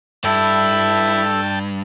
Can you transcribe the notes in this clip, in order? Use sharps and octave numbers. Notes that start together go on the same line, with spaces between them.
G2 E4 A4 G5 A5